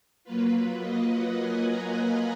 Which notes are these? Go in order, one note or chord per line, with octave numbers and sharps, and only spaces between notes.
F#3 A#3 F4 B4
D#5
F#5
G#5
A#5
B5